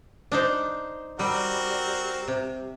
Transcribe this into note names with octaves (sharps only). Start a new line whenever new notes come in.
D4 D#4 C5
G3 C4 F#4 A#4
C3